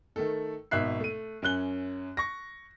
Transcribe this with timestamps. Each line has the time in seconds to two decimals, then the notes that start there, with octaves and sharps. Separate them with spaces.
0.16 D#3 A3 A4
0.71 G#1 B2 D#4 E5 F#6 C7
1.00 A3 D#7
1.42 F#2 C#4 F#6 G7
2.17 C#6 A#6